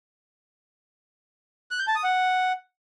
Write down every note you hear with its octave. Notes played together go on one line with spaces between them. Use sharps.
F#6
G6
A5
D#6
F#5